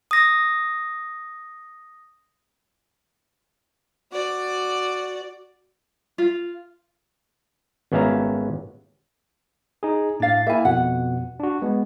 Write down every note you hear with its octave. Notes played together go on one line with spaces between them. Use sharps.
D#6 A#6
F#4 D5
F4
G#1 B3 C#4 E5 F5 A#5
D#4 G#4
A2 D4 F5 A6
A#3 E4 E5 G#5
F2 B2 F#5
D4 F#4
G#3 B3